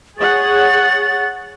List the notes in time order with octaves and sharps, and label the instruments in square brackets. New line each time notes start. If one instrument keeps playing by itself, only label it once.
[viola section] G#4 C#5 F#5 [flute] A6